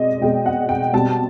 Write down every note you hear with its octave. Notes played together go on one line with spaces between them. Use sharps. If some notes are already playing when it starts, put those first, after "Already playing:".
Already playing: B2 G#3 C4 D5 D#5
B2 G#3 C4 G5
F#5
G5
B2 G3 C4 A5